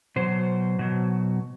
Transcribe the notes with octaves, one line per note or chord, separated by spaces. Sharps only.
B2 F#3 C5
B2 F#3